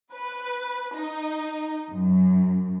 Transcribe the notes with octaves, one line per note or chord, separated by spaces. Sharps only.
B4
D#4
F#2